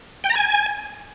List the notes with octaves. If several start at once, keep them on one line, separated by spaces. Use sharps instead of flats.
G5
A#5
G#5